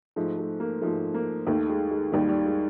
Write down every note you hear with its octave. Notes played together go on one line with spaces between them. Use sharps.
G#2 F3 A3
A3
A#3
G#2 F3 A3
A#3
D#2 D#3 A3
G#3
G#3
D#2 D#3 G3
G3
G#3